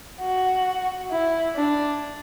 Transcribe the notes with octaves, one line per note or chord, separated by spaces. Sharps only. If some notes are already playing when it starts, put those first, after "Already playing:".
F#4
E4
D4